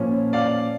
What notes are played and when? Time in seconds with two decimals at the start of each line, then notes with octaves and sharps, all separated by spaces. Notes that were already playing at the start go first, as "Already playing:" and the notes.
Already playing: A#2 F3 C#4
0.33 D5 F5